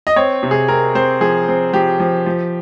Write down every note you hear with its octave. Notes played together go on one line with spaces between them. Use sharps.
D#5
C4 C#5
C3
G#4
C4 A#4
C4 C5
F3 G#4
C4
F3 G4
F3
F3